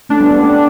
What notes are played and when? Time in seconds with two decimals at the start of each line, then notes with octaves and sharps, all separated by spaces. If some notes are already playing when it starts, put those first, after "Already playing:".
0.09 A3 C#4 D4
0.20 G3 B3
0.31 G3 B3
0.41 A3 C#4